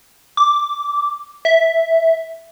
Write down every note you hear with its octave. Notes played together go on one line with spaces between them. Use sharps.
D6
E5